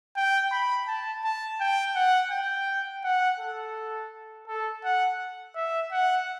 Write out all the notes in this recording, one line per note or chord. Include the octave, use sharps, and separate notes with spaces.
G5
B5
A5
A5
G5
F#5
G5
F#5
A4
A4
F#5
E5
F#5